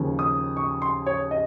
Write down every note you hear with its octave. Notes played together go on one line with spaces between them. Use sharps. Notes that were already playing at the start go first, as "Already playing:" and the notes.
Already playing: D#2 C#3 F3
D#6
C#6
C6
C#5
D#5